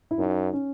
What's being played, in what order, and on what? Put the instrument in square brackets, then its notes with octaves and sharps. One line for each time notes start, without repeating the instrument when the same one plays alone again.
[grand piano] E4
[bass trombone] F#2 [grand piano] D#4
[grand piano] C#4